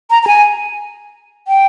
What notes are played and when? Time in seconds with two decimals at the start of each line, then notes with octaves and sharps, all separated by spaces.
0.10 A#5
0.23 A#5
0.27 G#5
1.48 G5